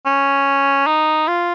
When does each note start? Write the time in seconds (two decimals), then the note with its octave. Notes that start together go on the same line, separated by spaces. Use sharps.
0.06 C#4
0.87 D#4
1.28 F4